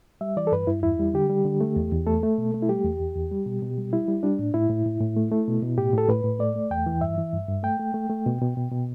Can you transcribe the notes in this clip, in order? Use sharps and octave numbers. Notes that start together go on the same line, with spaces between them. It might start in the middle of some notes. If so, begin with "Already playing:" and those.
G3 E5
E3 D5
A4
G2 B4
G2 E4
E2 E4
G3
D3 G4
G3
D3
A3
E2
E2
A3 A4
A3
B2
A3
E4
G3 G4
E2
E2
E2
G3
B2
B2
G3
G3 E4
G3
G3 D4
A2
A2 E4
A2
A2
A2
A3
A3
B2
B2
A2 G4
A2 A4
A2 B4
A2
A3 D5
A3
E2 G5
E3
G2 E5
E3
G2
G2
A3 G5
A3
A3
A3
B2
B2
B2
B2